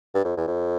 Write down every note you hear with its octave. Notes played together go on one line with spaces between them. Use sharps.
G2
F2
E2
F2